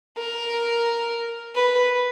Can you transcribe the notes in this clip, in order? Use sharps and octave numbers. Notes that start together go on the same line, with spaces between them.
A#4
B4